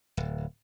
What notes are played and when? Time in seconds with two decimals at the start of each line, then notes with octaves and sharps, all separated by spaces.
0.17 D1